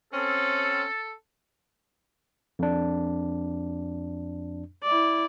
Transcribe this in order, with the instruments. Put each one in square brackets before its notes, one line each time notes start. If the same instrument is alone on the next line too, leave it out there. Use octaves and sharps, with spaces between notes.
[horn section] C4 C#4 [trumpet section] A4
[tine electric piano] F2 D4
[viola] E4 D5